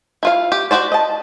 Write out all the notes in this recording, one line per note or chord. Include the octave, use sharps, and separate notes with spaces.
E4 F4 F5
G4
F#4 G4 C5 D5
D#5 A5